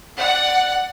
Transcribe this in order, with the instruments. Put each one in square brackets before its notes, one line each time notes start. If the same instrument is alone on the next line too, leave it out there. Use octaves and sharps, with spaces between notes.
[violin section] D5 F#5